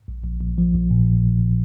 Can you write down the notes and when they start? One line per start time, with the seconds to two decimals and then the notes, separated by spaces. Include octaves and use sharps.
0.08 A#1
0.24 A#1
0.40 A#1
0.58 F3
0.75 A#1
0.91 A#2